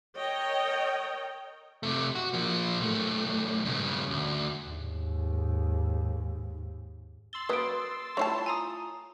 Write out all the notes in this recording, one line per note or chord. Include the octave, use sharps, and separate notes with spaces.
A#4 C#5 D#5 G5
C3 A3
F#4
F3 A#3
B1 A3
G2 C#3
D2
D#2 G#2
C6 E6 A6 F#7 G7
C#3 F#3 A#3 B4 D#6 D7
A3 E4 F4 C5 C#5 A5
G#5 A#5 D#6